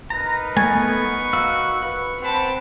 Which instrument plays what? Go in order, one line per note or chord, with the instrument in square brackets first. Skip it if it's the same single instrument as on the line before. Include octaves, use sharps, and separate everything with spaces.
[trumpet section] D#4 A#4 B4 [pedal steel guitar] A#5
[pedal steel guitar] A3 B3 [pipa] G#5 [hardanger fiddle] C#6
[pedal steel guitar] F#4 F5 E6
B4
[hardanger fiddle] C4 A5 [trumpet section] F#5 G5 B5